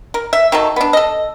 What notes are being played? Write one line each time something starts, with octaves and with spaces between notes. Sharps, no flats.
A#4
E5
D#3 F#3 A4
B3 D4
A4 D#5